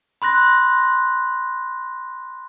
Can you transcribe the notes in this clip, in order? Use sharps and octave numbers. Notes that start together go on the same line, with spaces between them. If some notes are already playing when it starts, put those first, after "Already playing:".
B5 C6 F#6 A#6